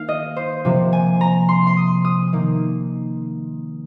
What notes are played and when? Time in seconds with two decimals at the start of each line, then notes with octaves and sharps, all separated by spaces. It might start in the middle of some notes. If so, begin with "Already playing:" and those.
Already playing: D#3 A#3 F5
0.09 D#5
0.36 C5
0.65 C3 F3 A#3
0.93 G#5
1.21 A#5
1.49 C6
1.67 C6
1.77 D#6
2.05 D#6
2.33 D#3 A#3